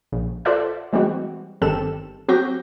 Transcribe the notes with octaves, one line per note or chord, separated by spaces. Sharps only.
A#1
F4 A4 C5 D5 E5 F#5
E3 G3 G#3 C4 F#4
G1 D#3 C4 G4 A4 E7
F#3 C4 F#4 G4 G6 A#6